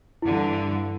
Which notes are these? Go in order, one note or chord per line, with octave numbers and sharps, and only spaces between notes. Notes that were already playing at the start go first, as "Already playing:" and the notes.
G2 D3 E3 E4